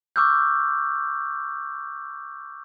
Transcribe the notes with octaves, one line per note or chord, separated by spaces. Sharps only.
C#6 D6 E6 F6 G6